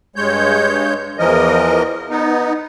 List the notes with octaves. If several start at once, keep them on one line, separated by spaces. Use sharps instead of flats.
G2 G#3 C#5 G6
E2 E3 F3 A#4 D#5
B3 D#4